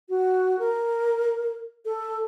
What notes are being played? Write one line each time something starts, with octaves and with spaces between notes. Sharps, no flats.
F#4
A#4
A4